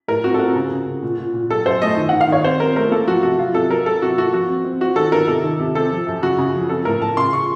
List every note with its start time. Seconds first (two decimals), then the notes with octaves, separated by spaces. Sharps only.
0.08 A2 A#4
0.24 C4 F#4
0.34 A4
0.39 C4 F#4
0.55 C#3
0.71 C#3
0.87 C#3
1.03 A#2
1.18 A#2
1.34 A#2
1.50 F#3 A4
1.65 F#2 C5
1.82 A3 D#5
1.97 D#3
2.09 D#3 F#5
2.21 F5
2.28 D#3 C#5
2.44 C4 C5
2.60 C4 A#4
2.76 A3 A#4
2.91 A#3 A4
3.07 F3 F#4
3.23 C3 F#4
3.39 F#3 F4
3.54 C3 A4
3.70 F#3 A#4
3.86 F#3 A4
4.02 C3 F#4
4.17 A#3 F#4
4.34 F3 F#4
4.49 C4
4.64 C4
4.81 C4 F#4
4.96 D#3 A4
5.12 D#3 A#4
5.28 C3 A4
5.44 D#3
5.60 C3
5.75 C4 A4
5.92 F3
6.07 F#2
6.22 C#3 F#4
6.38 C#3
6.54 F3
6.69 C4 A4
6.85 A2 A#4
7.01 A2 A5
7.17 C#3 C6
7.33 C#3 C#6